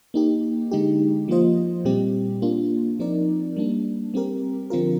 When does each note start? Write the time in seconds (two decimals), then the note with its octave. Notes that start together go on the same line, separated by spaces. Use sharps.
0.14 A#3 D#4 G4
0.71 D3 G#3 D#4 G4
1.28 F3 A#3 F4 C5 D#5
1.85 A#2 G3 C4 G4
2.42 A#3 D4 F4
2.99 F3 C4 D#4 A#4 D5
3.56 G3 A#3 D4
4.14 G3 C4 G4 A#4
4.70 D3 F3 C4 F4 A#4